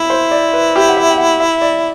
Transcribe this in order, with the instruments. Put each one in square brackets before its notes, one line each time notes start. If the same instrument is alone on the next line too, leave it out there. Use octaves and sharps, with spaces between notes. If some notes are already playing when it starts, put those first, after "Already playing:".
Already playing: [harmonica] E4 [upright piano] E5
[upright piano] C5
D5
B4
G4
F#5
E5
G5
F#5
E5
D5